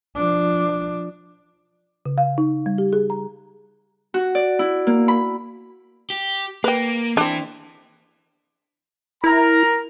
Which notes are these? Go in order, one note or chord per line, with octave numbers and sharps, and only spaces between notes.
F3 D4
C#3
F5
D#4
G3
G4
G#4
A#5
F#4
D5
E4
A#3
B5
G4
A#3 B4 G5
E3 C4 D4
E4 A#4 A#5